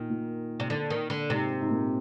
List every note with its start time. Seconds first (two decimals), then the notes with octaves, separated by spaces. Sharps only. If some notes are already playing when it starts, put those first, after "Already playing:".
Already playing: A#2 D#3
0.10 A#2
0.60 C3
0.70 D3
0.90 D#3
1.10 D3
1.30 G#2 C3
1.61 G#2
1.70 A#2